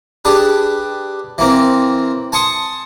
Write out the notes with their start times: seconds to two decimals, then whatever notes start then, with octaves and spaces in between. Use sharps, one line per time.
0.25 D4 G4 G#4 B4
1.38 E3 A#3 C4
2.32 G#5 A5 C6 C#6 D#6